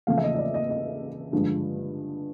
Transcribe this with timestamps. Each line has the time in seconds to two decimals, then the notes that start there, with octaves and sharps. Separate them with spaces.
0.07 E2 C#3 F3 A3 F5
0.18 E5
0.23 D#5
0.35 D#5
0.38 D5
0.54 D#5
0.70 D#5
1.32 G2 D3 F3 G#3